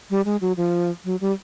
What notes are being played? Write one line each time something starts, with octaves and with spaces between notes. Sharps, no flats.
G3
G#3
F#3
F3
F#3
G3